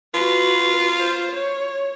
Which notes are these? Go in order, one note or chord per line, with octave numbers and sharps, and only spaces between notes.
F4 F#4 B4
C5
C#5